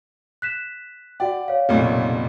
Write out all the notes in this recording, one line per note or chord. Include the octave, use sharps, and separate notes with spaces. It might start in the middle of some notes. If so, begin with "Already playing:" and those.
F#6 B6 E7
F#4 D5 F#5 G5
C#5 F5
F1 B1 A#2